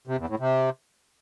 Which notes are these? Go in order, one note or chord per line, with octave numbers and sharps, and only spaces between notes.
C3
E2
A2
C3